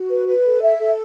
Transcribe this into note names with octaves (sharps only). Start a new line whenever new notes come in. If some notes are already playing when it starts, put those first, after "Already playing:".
Already playing: F#4
B4
B4
A4
E5
A4